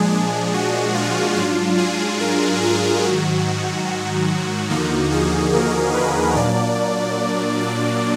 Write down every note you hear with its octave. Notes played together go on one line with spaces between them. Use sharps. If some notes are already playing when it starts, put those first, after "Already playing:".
Already playing: A#2 F3 G#3 D4 G#4
G#4
F#4
F4
G#2 F#3 D4 F4
G#4
A#4
G#4
G#2 D#3 F#3 F#4
D#2 D3 F3 A#3 D#4 F#4
G#4
A#4
B4
A#2 F#3 A#3 D4 D5
D5